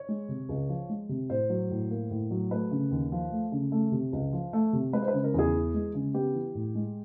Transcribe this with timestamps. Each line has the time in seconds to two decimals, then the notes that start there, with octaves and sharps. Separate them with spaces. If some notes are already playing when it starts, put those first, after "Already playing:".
Already playing: C#5
0.08 G#3
0.29 C3
0.49 C#2
0.69 F3
0.89 G#3
1.09 C3
1.30 A2 C5
1.50 F#3
1.70 A2
1.90 A#3
2.11 A2
2.31 F#3
2.51 A3 B4
2.71 C#3
2.91 D#2
3.12 F3
3.32 A3
3.52 C#3
3.72 A3
3.92 C3
4.13 C#2
4.33 F3
4.53 A3
4.73 C3
4.93 G#3 B4
5.02 C5
5.08 B4
5.13 C#3
5.24 A#4
5.34 E2 G#4
5.54 E3
5.74 G#3
5.94 C#3
6.14 B3 G4
6.34 E3
6.55 A2
6.75 G#3